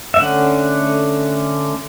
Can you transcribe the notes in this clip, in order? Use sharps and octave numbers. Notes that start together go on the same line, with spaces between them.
E5
D3 A3 C#4 F#5